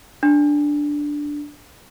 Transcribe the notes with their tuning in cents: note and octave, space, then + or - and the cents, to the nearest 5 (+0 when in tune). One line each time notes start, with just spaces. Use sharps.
D4 +0